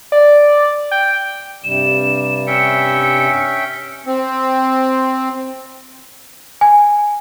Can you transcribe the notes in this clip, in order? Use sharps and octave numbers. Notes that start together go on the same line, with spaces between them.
D5
G5
G2 C3 G3 E7
C#4 E5 G5 C#7
C4
G#5